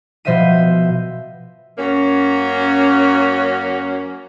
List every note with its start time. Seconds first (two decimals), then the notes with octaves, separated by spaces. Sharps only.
0.25 B2 F3 C5 D#5 E5 D#7
1.78 F#2 A#3 C#4